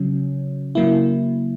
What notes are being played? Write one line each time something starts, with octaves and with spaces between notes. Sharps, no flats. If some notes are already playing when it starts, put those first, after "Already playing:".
Already playing: C#3 F#3 C#4
C#3 F#3 A#3 E4